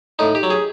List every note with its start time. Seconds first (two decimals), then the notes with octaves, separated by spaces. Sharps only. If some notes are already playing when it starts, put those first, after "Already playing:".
0.19 A2 D#4
0.35 G4
0.43 F#3
0.50 G#4